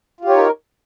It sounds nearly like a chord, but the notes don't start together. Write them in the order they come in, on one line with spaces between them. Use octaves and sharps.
F4 G4 C#5 D#4 A#4